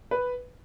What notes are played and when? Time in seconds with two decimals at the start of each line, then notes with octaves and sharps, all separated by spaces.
0.11 B4